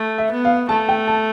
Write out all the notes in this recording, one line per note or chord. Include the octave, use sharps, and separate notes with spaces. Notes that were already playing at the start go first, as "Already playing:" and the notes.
Already playing: A3
E5
B3
F5
A3 A5
G5
A5